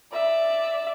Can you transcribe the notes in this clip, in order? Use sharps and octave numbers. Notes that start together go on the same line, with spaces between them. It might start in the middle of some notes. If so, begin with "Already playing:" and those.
D5 E5